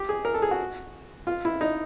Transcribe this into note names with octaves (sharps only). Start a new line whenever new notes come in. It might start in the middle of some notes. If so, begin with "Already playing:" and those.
Already playing: G4
G#4
A#4
A4
G#4
F#4
F4
E4
D#4